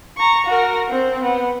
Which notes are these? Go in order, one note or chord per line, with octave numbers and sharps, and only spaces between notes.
A#5 C#6
F#4 A#4
C4
B3